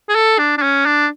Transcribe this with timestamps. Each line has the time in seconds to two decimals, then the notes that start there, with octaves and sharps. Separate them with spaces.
0.09 G#4
0.15 A4
0.38 D4
0.58 D4
0.62 C#4
0.86 D4